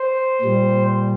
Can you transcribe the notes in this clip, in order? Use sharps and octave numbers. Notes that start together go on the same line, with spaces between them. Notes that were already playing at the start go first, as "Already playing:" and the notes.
Already playing: C5
A#2 G3